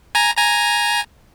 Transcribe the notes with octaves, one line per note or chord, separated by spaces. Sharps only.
G#5 A#5
G#5 A#5